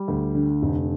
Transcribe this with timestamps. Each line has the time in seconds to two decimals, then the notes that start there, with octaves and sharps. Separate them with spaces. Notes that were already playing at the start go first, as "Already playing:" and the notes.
Already playing: G3
0.08 D2
0.35 D3
0.62 F1